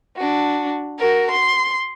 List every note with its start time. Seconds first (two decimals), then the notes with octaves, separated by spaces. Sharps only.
0.17 D4 F#4
0.99 F#4 A#4
1.31 C6